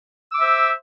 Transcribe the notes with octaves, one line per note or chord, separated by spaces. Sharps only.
C5 E5 D6 E6